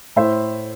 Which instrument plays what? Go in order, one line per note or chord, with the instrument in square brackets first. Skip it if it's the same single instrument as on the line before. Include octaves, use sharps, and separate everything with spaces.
[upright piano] A2 C5 E5